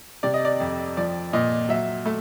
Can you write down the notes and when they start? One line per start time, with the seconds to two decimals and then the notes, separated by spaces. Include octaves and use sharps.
0.23 C3 D5
0.34 D#5
0.45 D5
0.60 F2
0.97 F3 D5
1.33 A#2 D#5
1.69 F#3 E5
2.06 A3